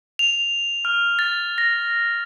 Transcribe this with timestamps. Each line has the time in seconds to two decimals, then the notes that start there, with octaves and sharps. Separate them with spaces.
0.19 F7
0.85 F6
1.19 A6
1.58 A#6